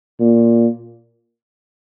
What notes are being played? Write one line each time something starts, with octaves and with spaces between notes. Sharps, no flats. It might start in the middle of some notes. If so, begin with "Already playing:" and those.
A#2